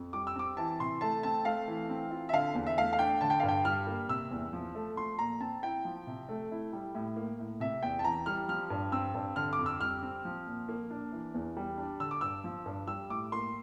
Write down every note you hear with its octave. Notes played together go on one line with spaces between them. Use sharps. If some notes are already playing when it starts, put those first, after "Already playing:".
Already playing: F2
G3 D6
E6
C4 D6
E3 A5
C3 C6
A3 A5
C4 A5
A3 F5
E3
C4
F4
E5
D3 F5
E2
E5
A3 F5
F5
D4 G5
D3 A5
G5
G2 F5
G5
G3 F6
A#3
C3 E6
E2
F3
A3
F3 C6
A#2 A#5
C4 A5
E4 G5
F3
C3
A3
E4
G3
A2
A#3
A2
C3 E5
E2 G5
A5
E3 A#5
G3 F6
F3 F6
G2
C4 E6
G2
D3 F6
D6
F2
E6
G3 F6
C4
F3
A#2
A#3
D4
E3
E2
G3
D4
D3 E6
D6
G2 E6
F3
G2
G3 E6
A2 D6
A#3 C6